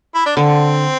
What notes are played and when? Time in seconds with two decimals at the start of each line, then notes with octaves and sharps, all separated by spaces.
0.15 E4
0.26 D4
0.37 D3 C4